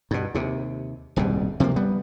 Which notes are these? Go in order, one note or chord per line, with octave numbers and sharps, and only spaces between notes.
G2 B2
D#2 C3
D#1 C2 G#2 B2
C3 F3 G#3 A#3
G3 B3